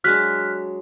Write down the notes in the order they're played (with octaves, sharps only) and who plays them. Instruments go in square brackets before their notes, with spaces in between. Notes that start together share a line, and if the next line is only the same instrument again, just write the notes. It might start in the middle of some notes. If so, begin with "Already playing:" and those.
[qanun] F#3 G#3 D4 [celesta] F6 F#6 B6